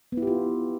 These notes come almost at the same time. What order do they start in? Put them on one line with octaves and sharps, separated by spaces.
B3 E4 G4 F4